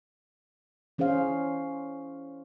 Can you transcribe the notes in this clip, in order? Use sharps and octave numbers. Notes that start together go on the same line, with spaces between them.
E3 C#4 G#4 C5 F5